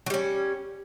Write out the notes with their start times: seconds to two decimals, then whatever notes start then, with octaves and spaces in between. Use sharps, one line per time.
0.06 F#3
0.10 G3
0.14 C#4